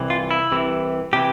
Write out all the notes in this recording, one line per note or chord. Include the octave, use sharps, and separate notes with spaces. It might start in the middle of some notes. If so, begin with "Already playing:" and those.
Already playing: C2 C3 E3
F4
E4
C2 C3 E3
C3 E3 G4